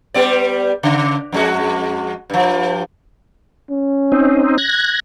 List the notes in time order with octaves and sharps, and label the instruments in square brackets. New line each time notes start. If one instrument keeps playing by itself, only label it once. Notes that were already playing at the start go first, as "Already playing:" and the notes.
[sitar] G3 B3 D5
C#3
F2 G#3 F#4
G2 F3
[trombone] C#4
[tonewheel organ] C4 D#4
F#6 G#6 A#6